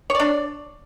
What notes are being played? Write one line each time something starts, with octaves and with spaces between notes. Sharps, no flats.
D4 C#5 D5